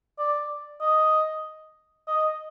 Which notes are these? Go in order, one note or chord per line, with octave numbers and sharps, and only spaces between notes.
D5
D#5
D#5